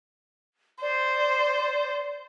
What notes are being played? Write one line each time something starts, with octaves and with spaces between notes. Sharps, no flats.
C5 D5